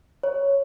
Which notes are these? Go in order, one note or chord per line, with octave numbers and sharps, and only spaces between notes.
C#5